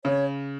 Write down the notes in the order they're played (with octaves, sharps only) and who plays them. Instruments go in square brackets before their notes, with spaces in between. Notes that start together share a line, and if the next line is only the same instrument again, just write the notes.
[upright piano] C#3 [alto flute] C#5